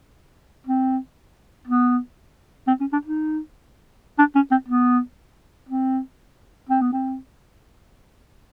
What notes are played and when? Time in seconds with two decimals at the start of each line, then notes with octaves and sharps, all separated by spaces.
0.67 C4
1.68 B3
2.67 C4
2.81 C#4
2.93 D4
3.05 D#4
4.19 D4
4.35 C#4
4.51 C4
4.68 B3
5.69 C4
6.69 C4
6.81 B3
6.93 C4